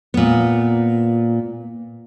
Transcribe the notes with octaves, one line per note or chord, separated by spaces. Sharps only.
A#2 B3